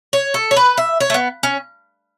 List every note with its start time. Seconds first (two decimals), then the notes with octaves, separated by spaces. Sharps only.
0.13 C#5
0.34 A4
0.51 C#5
0.56 B4
0.77 E5
1.00 C#5
1.10 A3
1.14 B3
1.43 C#4